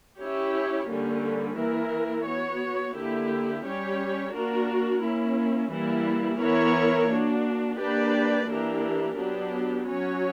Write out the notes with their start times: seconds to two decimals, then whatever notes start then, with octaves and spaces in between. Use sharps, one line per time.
0.19 C#4 E4 G4 C#5
0.88 D3 G3 A#3 C#4
1.57 E3 A#3 E4 A#4
2.26 B3 F#4 C#5
2.96 D3 A#3 E4 G4
3.64 G3 C#4 G4 C#5
4.33 A#3 D4 F#4 A#4
5.02 A#3 C#4 E4
5.72 E3 G3 A#3 E4
6.41 E3 B3 E4 A#4 C#5
7.10 A#3 D4 F#4
7.79 A#3 D4 G4 B4 D5
8.48 E3 A#3 D4 G4 A#4
9.17 F#3 B3 D4 G4
9.87 F#3 C#4 F#4 C#5